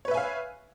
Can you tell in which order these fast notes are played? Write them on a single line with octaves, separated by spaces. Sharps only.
C#5 B4 E5 G#5 F5